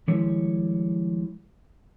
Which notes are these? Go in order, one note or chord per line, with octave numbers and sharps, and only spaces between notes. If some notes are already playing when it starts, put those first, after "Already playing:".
D#3 F3 G3 G#3 E4 C#5